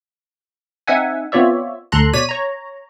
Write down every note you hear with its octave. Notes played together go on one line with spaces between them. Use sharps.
C4 D#4 E5 F#5 G#5
B3 C4 F4 C#5 D5 E5
D2 A4 A#5 C6 F#6
B2 C#5 D5 B6 D#7
C#5 A#5